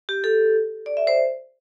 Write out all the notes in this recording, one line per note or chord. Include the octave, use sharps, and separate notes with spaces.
G4
A4
D5
E5
C5